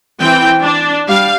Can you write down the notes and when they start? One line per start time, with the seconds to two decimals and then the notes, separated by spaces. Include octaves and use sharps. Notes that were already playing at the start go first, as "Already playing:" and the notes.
0.21 E3 C4 G5
0.61 D4
1.08 G3 F5